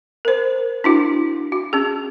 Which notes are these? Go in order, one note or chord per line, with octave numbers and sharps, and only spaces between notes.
A#4 C5
D4 E4 F#4
F#4
C#4 G#4